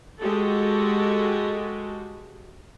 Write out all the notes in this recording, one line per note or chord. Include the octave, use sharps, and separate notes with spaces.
G#3 F#4 G4 A4